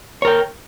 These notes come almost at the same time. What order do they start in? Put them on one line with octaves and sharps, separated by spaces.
C#5 A#4 G5